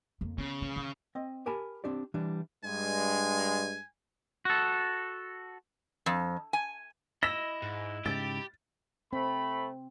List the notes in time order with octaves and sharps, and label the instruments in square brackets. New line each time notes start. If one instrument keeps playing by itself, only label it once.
[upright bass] F2 A#3
[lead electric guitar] C#3 [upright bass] B3
[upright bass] E3
D#3
[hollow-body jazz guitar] C4 D#5
G4 A#4 G#5 A5 B5
C4 D4 G4 D5
E3 G3 D4
[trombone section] G2 G#3 [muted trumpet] G#5
[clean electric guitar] F#4 A4
[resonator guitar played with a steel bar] F2
G#5
[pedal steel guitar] E4 D#5 E6 [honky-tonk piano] A#6
[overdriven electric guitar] G#2
[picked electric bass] G#2 C#3 [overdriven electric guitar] G4 [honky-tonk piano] A6
[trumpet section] A3 B5 [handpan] C4